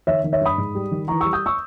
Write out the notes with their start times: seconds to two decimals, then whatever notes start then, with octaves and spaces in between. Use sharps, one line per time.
0.07 D#3 C#5 E5
0.24 D#3
0.33 C#5 E5
0.41 G2 B5 D#6
0.58 G#2
0.75 G3
0.91 D#3
1.08 E3 A#5 C#6
1.21 G3 C#6 E6
1.33 D#6 G6
1.46 C#6 E6